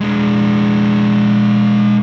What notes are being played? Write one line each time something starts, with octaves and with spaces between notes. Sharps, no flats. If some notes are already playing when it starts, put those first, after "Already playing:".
G#3 D4